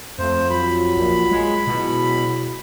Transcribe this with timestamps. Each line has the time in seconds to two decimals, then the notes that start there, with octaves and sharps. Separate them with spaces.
0.19 F2 A3 C5
0.50 F#3 F4 B5
0.97 A#1
1.31 G#3
1.67 B2 F#3 G#3 E4